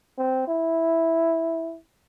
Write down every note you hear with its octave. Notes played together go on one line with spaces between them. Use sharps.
C4
E4